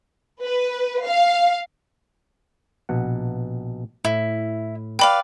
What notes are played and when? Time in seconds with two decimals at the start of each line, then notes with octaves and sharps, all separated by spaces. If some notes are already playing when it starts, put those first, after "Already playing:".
0.45 B4
1.07 F5
2.89 A#1 B2 F#5
4.05 A2 E4
4.99 B4 D5 F5 G5 B5